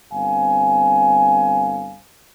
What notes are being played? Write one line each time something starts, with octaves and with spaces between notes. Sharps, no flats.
G1 C4 F5 G#5